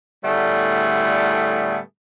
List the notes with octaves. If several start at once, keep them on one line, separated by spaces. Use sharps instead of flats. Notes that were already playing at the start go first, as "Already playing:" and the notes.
A2 D3 G3 A3 B3 G#4